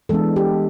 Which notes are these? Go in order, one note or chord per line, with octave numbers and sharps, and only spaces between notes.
E3 G#3 B3 D4 A4
G4